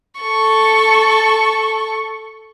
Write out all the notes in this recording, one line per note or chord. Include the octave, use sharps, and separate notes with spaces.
A4 C#6